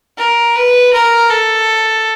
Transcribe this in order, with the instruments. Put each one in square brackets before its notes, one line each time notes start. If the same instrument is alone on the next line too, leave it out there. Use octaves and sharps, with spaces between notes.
[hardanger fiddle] A#4
B4
A#4
A4